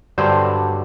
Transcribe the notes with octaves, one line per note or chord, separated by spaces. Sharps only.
G2 D3 F#3 C5